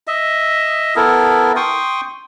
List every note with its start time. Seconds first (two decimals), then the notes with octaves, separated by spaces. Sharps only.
0.07 D#5 E5
0.96 B3 E4 A4 A#4
1.56 G5 C6 C#6 D#6